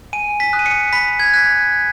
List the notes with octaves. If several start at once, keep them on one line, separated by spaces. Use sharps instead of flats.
G#5 D#7
B6
D#6 F#6
D#7
C#7
B5 B6
G#6
F#6 B6